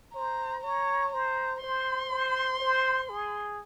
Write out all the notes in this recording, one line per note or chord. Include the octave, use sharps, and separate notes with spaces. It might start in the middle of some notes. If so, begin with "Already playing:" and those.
C5 A#5
C#5 A#5
C5 A#5
C5 C6
C5
C5
G#4